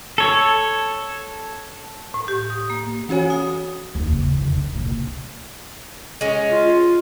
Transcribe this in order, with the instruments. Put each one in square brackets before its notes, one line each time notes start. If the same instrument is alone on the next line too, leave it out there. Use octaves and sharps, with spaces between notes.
[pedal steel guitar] A4 C#5
[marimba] A2
G4
D#6
A#3
[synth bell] E3 C#4 F#4 C#5 G#5
D#6
[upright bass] D#2
C#3
E2
D3
D#3
A#2
C2
[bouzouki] G#3 C#4
[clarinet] F4